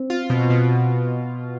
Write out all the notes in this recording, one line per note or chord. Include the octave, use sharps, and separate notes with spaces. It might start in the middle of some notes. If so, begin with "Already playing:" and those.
Already playing: C4
F4
B2
B2